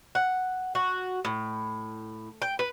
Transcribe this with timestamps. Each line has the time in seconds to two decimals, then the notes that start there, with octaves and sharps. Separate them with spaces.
0.15 F#5
0.75 F#4
1.25 A2
2.42 G5
2.59 B4